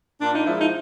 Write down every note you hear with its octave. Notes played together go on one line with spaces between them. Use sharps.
A#2 D4
D#4
F3 G#3 E4
D#4